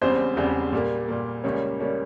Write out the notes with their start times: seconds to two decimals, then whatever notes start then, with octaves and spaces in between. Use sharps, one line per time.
0.02 E1 E2 C#3 G3 C4 C5
0.36 E1 E2 C#3 G3 C4
0.72 A#2 G3 A#3
1.08 A#2 G3 A#3
1.44 C#2 C#3 G3 A#3 C#4 C#5
1.80 C#3 G3 A#3 C#4